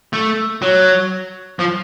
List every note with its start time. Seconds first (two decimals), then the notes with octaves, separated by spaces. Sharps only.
0.13 A3
0.62 F#3
1.59 F3